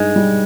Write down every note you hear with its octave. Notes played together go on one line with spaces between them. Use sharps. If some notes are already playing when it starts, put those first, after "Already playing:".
Already playing: G2 G#3 D#4
G3